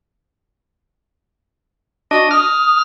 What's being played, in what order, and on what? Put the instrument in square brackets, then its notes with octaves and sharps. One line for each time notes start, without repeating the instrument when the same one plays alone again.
[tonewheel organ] D4 D#5 [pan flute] F#4
[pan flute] D#6 [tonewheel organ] F6